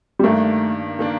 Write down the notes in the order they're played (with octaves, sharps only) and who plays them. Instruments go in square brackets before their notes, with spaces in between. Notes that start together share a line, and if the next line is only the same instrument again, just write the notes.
[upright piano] G3
[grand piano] G2 D#3 A#3 D4 [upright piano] A3
[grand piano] D#3 A#3 D4